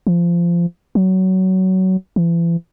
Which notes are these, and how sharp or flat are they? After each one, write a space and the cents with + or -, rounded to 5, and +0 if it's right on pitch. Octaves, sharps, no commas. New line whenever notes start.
F3 -20
F#3 +20
E3 +40